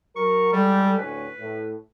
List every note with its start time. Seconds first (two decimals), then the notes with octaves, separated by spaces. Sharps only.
0.16 F#3 A#4 C#6
0.52 G3 G#3 G4 A4
0.99 D2 A2 C#4 B4
1.39 A2